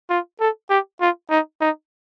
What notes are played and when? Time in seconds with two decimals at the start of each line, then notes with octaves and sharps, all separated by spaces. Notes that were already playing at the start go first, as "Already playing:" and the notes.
0.10 F4
0.40 A4
0.70 G4
1.01 F4
1.30 D#4
1.61 D#4